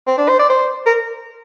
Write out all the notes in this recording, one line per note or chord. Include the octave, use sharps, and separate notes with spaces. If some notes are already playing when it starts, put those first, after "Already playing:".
C4
D4
C5
D5
C5
A#4